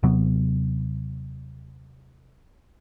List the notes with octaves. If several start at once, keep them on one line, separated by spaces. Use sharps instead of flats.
D#2 C3 F#3 B3